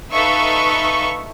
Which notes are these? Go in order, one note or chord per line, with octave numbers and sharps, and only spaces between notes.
D#4 A4 B4 E5 F5 C#6